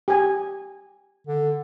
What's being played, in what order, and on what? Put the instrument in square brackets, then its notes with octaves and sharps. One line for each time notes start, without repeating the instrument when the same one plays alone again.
[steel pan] G4 G#5
[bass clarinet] D3